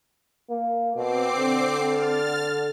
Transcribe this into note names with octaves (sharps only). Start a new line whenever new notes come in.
A#3
B2 C4 D6 C7
D3
F6 A6